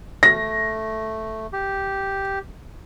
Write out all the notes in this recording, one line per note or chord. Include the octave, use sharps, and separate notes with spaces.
A3 A#6
G4